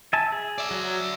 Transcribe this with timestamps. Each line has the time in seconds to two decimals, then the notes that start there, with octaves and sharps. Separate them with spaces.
0.13 E5 G#5 A5
0.32 G#4
0.58 D5 E5
0.71 F#3